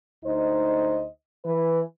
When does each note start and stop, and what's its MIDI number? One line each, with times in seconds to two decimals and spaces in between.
0.25 1.05 38
0.25 1.05 63
0.25 1.05 72
0.25 1.05 75
1.45 1.80 52
1.45 1.80 71